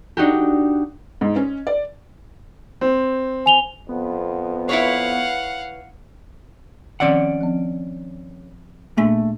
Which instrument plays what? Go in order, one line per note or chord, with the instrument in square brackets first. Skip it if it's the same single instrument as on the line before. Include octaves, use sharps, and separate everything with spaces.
[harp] D4 D#4 F#4 G4
[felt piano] G#2
C#4
D5
[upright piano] C4
[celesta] G#5 F7 G7
[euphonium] F2 [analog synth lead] B3
[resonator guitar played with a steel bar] E4 B4 C#5 [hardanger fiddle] F5 F#5
[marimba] D#3 F3 C4 [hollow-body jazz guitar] C#4 D5 F#5
[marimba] F3 C4
[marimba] A#2 A#3 D4 [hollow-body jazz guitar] A3